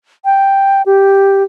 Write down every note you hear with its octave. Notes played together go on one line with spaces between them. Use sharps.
G5
G4